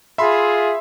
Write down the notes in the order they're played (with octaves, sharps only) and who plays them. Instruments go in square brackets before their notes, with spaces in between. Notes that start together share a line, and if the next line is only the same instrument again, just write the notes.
[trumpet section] F4 G#4 [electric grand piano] E5 B5 C6